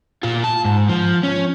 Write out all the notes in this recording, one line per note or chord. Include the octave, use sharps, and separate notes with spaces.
A#2 F4
A5
G#2
F3
C#4